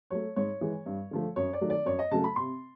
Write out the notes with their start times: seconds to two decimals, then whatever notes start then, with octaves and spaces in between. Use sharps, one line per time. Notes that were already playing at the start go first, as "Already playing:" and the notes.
0.10 F#3 A3 C#5
0.36 G#2 C#5
0.61 E3 G#3
0.86 G2
1.11 D3 F3 A3
1.36 F#2 C#5
1.53 D5
1.61 D#3 F#3 A3
1.70 D5
1.86 F#2 C#5
1.99 D#5
2.11 C#3 F#3 A3 A5
2.24 B5
2.36 C3 C6